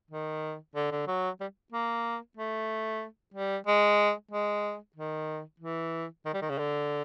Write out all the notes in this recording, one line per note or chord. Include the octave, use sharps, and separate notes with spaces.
D#3
D3
D3
F#3
G3
A#3
A3
G3
G#3
G#3
D#3
E3
D#3
G3
D#3
C#3
D3